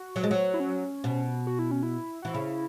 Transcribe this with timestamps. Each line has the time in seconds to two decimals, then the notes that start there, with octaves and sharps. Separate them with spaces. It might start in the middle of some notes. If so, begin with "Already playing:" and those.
Already playing: F#4
0.16 F#3
0.24 G#3
0.31 F#3
0.54 E4
0.60 C#4
1.04 B2
1.47 F#4
1.59 E4
1.71 C#4
1.83 E4
2.22 E3 F#4
2.34 C#3 E4